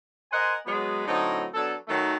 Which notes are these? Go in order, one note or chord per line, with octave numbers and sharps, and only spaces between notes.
A#4 C5 D#5 F#5 G#5 C6
F#3 G#3 B3
A2 D3 F#3 C4 D#4
F#3 B3 D4 A4
D#3 F#3 A3